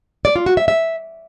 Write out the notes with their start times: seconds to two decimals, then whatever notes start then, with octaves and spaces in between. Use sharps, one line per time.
0.25 D5
0.36 F4
0.46 F#4
0.57 E5
0.68 E5